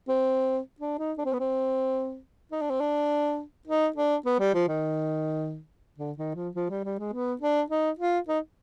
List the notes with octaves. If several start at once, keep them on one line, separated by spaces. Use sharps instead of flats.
C4
D4
D#4
D4
C4
B3
C4
D#4
D4
C4
D4
D#4
D4
B3
G3
F3
D#3
D3
D#3
F3
F3
G3
G3
G#3
B3
D4
D#4
F4
D#4